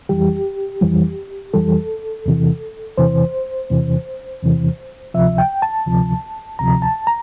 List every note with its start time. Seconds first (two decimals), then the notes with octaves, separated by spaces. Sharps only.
0.09 F2 E3 G3 G4
0.81 F2 E3 G3
1.54 F2 E3 G3 A4
2.26 E2 C3 E3
2.98 E2 C3 E3 C5
3.70 E2 C3 E3
4.43 E2 C3 E3
5.14 D2 C3 F3 E5
5.38 G5
5.62 A5
5.87 D2 C3 F3
6.59 D2 C3 F3 A#5
6.82 A5
7.07 A#5